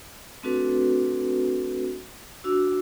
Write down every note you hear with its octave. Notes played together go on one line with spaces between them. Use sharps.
A3 C4 D4 F#4 A4 B4
D4 F#4 E6